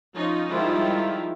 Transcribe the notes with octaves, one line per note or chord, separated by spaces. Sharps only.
F3 C#4 D#4 F4
D#3 F3 G3 G#3 E4 F4